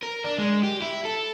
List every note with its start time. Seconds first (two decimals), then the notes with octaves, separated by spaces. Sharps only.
0.03 A#4
0.25 D4
0.38 G#3
0.63 G4
0.82 E4
1.05 A4